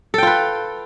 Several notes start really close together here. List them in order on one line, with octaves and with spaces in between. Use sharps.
A4 G5 F4 B4